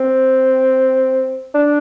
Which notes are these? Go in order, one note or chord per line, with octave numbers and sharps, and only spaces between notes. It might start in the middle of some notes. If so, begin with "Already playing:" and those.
Already playing: C4
D4